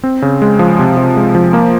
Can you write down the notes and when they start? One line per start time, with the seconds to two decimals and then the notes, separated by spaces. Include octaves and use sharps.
0.04 C4
0.22 C#3
0.42 G#3
0.59 F3
0.79 C3
0.97 C3
1.16 G#3
1.35 F3
1.53 A#3